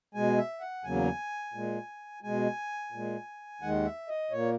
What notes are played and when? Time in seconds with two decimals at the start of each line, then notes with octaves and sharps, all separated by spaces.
0.14 B2 G#3 G#5
0.38 E5
0.61 F#5
0.84 E2 C#3 F#3 A#3 G#5
1.54 A#2 G#3
2.23 B2 G#3 G#5
2.92 A#2 G#3
3.62 D#2 D#3 G#3 F#5
3.85 E5
4.08 D#5
4.31 A#2 A#3 C#5